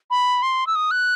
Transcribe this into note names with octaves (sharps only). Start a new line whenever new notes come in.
B5
C6
E6
D#6
F#6